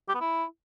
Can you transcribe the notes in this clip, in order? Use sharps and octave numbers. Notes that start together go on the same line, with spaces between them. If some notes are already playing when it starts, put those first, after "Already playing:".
G4
B3
E4